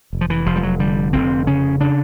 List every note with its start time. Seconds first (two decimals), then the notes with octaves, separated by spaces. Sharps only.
0.13 F1
0.21 F3
0.30 E3
0.46 F1 F3
0.56 G3
0.63 F#3
0.80 D3 G3
1.13 F1 C4
1.47 C#3 C#4
1.80 C#3 D4